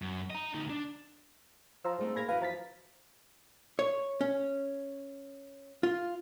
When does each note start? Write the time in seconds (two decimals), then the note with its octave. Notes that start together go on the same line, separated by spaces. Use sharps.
0.02 F#2
0.30 D#5 A#5
0.54 D2 D#4
0.70 D4
1.85 F3 A#5 C6 E6
1.99 G#2 G3 A3 C4
2.16 A#3 G#4 F5 B5 G#6 A#6
2.29 F#2 E3 E4 B4 F5
2.42 F3 A#5 A6 B6
3.79 C#5
4.21 C#4
5.83 F4